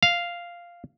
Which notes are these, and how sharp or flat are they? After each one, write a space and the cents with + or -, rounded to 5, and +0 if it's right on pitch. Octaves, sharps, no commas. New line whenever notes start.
F5 -5